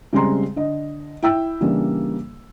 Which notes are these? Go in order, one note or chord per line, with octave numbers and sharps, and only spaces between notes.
C#3 G3 G#3 C4 A#5 C6
D3 D#5
E4 G5 E6
C#3 E3 G3 A#3 D4